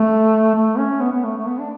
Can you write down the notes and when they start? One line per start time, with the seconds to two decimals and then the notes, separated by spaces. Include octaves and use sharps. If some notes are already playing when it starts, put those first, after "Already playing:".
Already playing: A3
0.55 A3
0.78 C#4
1.01 B3
1.12 B3
1.24 A3
1.38 A3
1.47 B3
1.59 D4